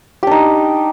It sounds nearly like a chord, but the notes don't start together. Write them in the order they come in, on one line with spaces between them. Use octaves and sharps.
G4 D4 D#4